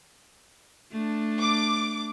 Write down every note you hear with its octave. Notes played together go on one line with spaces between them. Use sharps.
A3 D4
D6